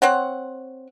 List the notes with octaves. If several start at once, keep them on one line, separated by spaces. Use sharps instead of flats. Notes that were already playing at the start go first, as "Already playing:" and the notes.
C4 C#5 F#5